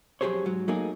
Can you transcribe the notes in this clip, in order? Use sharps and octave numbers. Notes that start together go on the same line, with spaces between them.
F2 F#3 G4 G#4 C5 C#5
G#2 F#3
F#3 A3 A#3 D#4 G#4